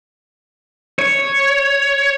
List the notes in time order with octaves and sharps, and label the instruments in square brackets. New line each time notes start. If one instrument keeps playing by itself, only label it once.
[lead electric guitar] C#5